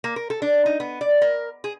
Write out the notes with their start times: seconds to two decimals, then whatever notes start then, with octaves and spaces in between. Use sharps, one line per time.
0.04 A#3
0.16 A#4
0.30 A4
0.42 D4
0.66 D#4
0.80 B3
1.01 D5
1.22 A#4
1.64 G#4